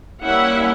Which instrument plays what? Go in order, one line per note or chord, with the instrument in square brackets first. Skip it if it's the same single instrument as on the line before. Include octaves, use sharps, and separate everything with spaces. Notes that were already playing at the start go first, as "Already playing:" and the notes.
[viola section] G3 A#3 C#4 E4 E5 F#5